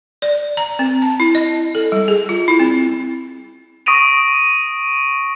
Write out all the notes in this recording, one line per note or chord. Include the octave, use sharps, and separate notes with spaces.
D5
A#5
C4
A5
E4
D#5
A4
G3
G#4
F4
E4
C4
C#6 D#6 A#6 D7 D#7 F7